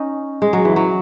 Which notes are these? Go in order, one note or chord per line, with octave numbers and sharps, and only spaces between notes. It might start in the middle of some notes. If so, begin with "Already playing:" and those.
Already playing: C#4 D#4
G#3
F#3
E3
F#3